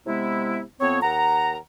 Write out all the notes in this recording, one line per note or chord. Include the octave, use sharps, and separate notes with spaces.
C3 G#3 B3 E4
F2 B3 C4 C#5
D#2 F#5 A#5